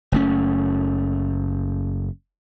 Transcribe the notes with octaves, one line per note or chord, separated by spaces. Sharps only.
F#1 A3 C#4